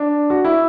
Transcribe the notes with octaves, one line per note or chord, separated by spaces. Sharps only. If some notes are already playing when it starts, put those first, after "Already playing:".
Already playing: D4
F#4
E4